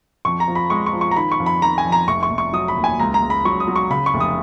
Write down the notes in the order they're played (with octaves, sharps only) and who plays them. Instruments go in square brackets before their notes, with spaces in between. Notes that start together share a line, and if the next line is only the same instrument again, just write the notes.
[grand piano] F2 C#6
A#5
F3
B5
G#3 C#6
C#6
F3
C#6
A#5
D#3 B5
C#6
F2
B5
D#3 A#5
G#5
F2
A#5
F1 C#6
C#6
F1
C#6
F#3 D#6
B5
D#2
G#5
C#2 A#5
A#5
C#2
B5
F#3 C#6
D#6
F#3
C#6
C#3 B5
C#6
F1
D#6